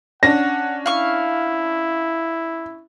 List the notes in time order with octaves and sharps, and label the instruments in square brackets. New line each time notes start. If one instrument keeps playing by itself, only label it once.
[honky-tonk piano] C#4 D4 [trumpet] F#5 [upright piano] A#6
[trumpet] E4 [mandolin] F5 C#6